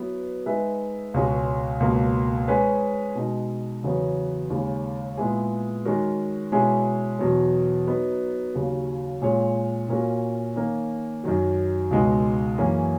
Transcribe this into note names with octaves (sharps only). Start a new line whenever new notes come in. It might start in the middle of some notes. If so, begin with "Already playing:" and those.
Already playing: F#3 B3 E4 B4
G#3 D#4 G#4 B4 E5
C#2 B2 G#3 C#4 F#4
C#2 B2 A#3
G#3 C#4 G#4 B4
B2 G#3 D#4
E2 C#3 F#3 B3
D#2 C#3 G#3
A#2 G#3 B3 E4 G#4
D#3 G#3 C#4 F#4 A#4
B2 G#3 C#4 E4 G#4
E2 B2 F#3
F#3 B3 D#4
D#2 C#3 F#3
A#2 G#3 C#4 G#4 C#5
A#2 A#3 C#4 F#4 A#4
D#3 A#3 C#4
F#2 D#3 F#3
C#2 B2 G#3 D#4
F#2 E3 A#3 C#4 G#4